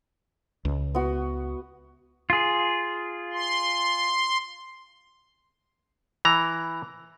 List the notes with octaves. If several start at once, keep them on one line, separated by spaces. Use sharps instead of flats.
C#2
B3 F#4
F4 G#4
C6
E3 A#5